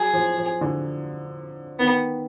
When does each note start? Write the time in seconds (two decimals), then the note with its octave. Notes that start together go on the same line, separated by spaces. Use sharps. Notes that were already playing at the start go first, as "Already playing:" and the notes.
Already playing: F#3 G#4
0.13 F3
0.37 F3
0.61 D3
1.79 D#3 B3